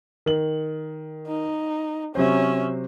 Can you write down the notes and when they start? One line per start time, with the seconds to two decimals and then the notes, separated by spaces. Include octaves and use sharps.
0.26 D#3 F#7
1.27 D#4
2.15 C3 F#3 C#4 C5 E5